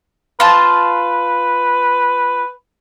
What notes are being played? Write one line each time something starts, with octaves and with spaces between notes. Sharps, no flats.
F4 B4 A5